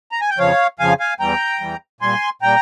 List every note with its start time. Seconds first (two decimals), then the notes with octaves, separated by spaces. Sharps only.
0.12 A#5
0.21 G#5
0.30 G5
0.38 F2 C#3 F3 C#5 F5
0.79 F2 C#3 F3 F5 G#5
1.00 F5 G#5
1.20 E2 E3 G3 G5 A#5
1.60 E2 E3 G3
2.01 A#2 G3 G#5 C6
2.42 A#2 G3 G5 A#5